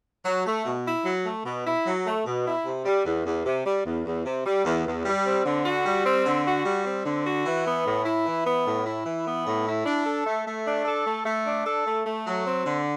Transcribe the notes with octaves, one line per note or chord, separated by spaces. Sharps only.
F#3
A3
B2
E4
F#3
A3
B2
E4
F#3
A3
B2
E4
C3
G3
E2
E2
C3
G3
E2
E2
C3
G3
E2
E2
G3
C4
D3
F#4
G3
C4
D3
F#4
G3
C4
D3
F#4
E3
B3
A2
E4
E3
B3
A2
E4
E3
B3
A2
E4
D4
A4
A3
A3
D4
A4
A3
A3
D4
A4
A3
A3
F#3
C4
D3